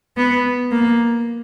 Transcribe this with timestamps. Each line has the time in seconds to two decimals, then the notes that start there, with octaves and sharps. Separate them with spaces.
0.17 B3
0.71 A#3